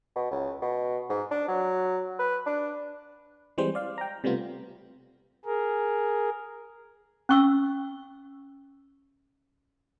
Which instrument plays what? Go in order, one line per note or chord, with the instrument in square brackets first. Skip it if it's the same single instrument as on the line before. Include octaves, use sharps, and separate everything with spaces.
[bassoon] B2
C#2
B2
G#2
D4
F#3
B4
D4
[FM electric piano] E3 G3 G#3 C4 C5
D5 F5
G5 A#5
C3 G3 A3 B3 F4
[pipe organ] G#4 A#4
[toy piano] C#4 C#6 E6